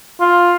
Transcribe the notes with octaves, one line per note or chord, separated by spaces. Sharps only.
F4